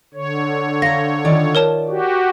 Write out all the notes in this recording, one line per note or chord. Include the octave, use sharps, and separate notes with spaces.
D3 C#5
C5 F5 A#5 A#6
D#3 F4 D5
A#4 C#5 A5
F#4 G4